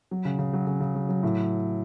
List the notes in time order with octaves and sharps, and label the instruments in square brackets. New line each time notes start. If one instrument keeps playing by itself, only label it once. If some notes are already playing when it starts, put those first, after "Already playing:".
[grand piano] F#3
C#3
C#3
F#3
C#3
C#3
F#3
F#3
A2